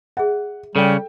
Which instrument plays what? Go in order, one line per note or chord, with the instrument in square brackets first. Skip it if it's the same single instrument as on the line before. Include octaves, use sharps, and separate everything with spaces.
[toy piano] G#4 E5 [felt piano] F#5
[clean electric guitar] C#3 [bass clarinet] G3 [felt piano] A4 G5